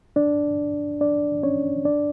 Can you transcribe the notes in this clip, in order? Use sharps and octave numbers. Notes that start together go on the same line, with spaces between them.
D4 D5
D4 D5
C#4 C#5
D4 D5